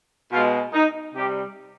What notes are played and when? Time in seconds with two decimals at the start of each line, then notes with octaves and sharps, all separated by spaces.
0.32 B2 F4
0.37 G#3
0.74 D#4
1.14 C3 G3 G4